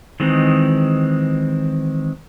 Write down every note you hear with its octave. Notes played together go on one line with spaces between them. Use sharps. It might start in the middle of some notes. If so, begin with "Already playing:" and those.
D#3 E3 G#3 C4